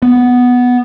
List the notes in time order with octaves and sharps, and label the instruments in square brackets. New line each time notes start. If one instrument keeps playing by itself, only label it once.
[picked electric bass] B3